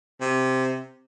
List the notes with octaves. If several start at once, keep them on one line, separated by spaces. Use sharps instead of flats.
C3